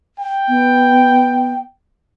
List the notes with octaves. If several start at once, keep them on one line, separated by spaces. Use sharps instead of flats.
G5
B3